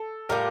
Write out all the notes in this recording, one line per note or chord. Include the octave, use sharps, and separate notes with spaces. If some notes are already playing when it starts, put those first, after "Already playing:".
Already playing: A4
A2 G3 A#3 F4 A#4